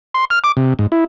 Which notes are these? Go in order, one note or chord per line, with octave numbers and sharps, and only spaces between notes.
C6
F6
D6
C3
G#2
E4